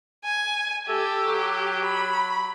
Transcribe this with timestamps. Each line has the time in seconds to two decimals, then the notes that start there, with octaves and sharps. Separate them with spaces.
0.24 G#5
0.88 G4 A4
1.25 F#3
1.84 B5